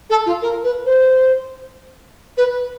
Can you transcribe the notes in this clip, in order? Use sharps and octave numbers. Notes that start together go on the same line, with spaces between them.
A4
F4
A#4
B4
C5
B4